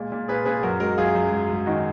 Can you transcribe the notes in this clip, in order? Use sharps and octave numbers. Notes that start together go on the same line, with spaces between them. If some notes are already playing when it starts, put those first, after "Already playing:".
Already playing: A#2 G#3
A#2
A#2 G#4 B4
A#2 G#4 B4
F#2 F#4 A#4
G#3 F#4 A#4
F#2 F4 G#4
F#2
G#2
G#2
D#3 D#4 F#4